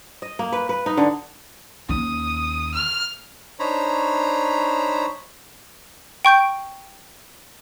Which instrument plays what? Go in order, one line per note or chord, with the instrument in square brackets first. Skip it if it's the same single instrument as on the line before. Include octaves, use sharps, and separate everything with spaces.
[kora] D#5
A#3
B4
B4
D#4
D3
[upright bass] D#2 C#4 [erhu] D#6
[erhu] F6
[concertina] D4 D#4 C5 C#5 A#5 B5
[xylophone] G5 C#6 G6 D7